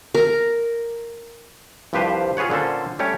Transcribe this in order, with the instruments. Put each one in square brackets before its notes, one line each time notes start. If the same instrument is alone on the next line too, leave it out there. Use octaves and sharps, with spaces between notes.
[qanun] A#4
[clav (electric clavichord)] C2 G2 F3 G4 B4 C5
F4 G#4 B4 C#5 F#5
A#2 D3 C#4 A4 C5
G3 A3 C#4 G4 C#5